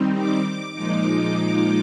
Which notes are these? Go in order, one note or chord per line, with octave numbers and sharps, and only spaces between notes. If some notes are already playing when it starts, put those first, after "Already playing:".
Already playing: D#3 G3 C4 D#4
D6
D6
A#2 F3 G#3 D#4 D6